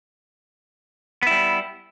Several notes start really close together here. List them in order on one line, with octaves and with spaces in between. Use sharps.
B3 E4 G3